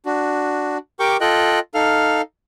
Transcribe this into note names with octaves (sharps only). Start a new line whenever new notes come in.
D4 F#4
G4 A#4 G5 C#6 D6
F4 A4 D#5 G5 F#6
D#4 A4 F5 F6